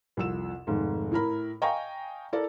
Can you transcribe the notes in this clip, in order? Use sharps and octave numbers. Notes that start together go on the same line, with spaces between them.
C2 F2 E6 E7
F1 G#2 D#3
A2 E4 A#4 B5
D#5 F5 G5 G#5 A#5 C#6
E4 A4 A#4 D5